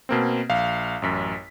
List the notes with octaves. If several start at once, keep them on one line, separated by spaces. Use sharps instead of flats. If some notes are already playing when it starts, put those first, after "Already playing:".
B2 A#3 C4
A#1 F5
A1 F#2 B6